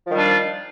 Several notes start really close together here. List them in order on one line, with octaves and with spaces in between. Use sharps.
F3 D#3 G3 D4 F4